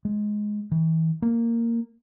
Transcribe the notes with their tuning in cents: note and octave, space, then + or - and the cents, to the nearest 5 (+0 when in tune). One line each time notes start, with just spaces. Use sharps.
G#3 +10
E3 -35
A#3 -10